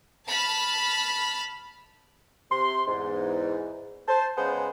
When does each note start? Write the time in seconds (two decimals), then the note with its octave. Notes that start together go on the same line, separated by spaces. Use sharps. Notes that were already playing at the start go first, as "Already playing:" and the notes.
0.27 A5 B5 F6
2.51 C3 C6
2.87 E2 G#2
4.08 C5 A5
4.37 C#3 G#3 B3 G#4 C5